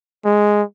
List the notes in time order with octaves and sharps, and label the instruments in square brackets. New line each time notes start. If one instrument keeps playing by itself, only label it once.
[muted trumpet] G#3